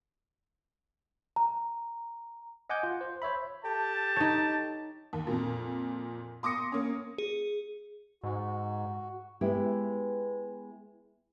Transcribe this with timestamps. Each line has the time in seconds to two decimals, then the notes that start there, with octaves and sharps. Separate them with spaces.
1.36 A#5
2.70 D#5 F#5 G#5 D6 G6
2.83 F4
3.01 C5
3.22 C5 C#5 E5 B5
3.64 G4 A4 A5
4.16 D#4 C#5
5.13 D#2
5.27 F2 A#2
6.43 C6 D6 D#6 A#6 C#7
6.72 A#3 C#4
7.18 G#4
8.24 G#2 F#4
9.41 G#3 B3 E4 G4